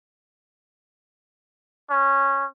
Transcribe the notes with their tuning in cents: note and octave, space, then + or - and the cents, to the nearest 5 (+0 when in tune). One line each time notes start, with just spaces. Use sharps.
C#4 -15